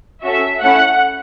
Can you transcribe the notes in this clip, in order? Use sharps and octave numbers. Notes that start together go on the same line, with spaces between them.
C#4 F#4 A4 E5
A3 C#4 E4 F#5